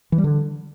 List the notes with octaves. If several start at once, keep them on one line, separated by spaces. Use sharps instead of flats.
E3
G3
D3